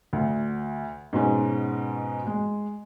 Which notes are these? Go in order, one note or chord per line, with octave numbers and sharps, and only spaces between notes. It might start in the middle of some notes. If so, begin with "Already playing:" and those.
D2
G#2 B2 G#3 C#4
G#3